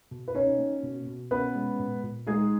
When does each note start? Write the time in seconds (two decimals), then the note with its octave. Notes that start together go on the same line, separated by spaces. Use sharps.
0.11 B2
0.28 B4
0.35 C#4 D#4 C#5
0.59 A#3
0.83 B2
1.07 B2
1.31 B3 C#4 B4
1.55 G#3
1.79 A#2
2.03 A#2
2.27 G#3 D#4 G#4